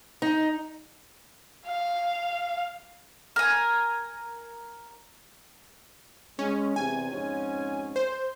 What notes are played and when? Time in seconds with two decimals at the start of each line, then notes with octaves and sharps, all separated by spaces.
0.22 D#4
1.66 F5
3.36 A#4 G#5
6.39 G#3 C#4
6.76 E2 C3 G#5
7.12 F2 G#2 C#4
7.96 C5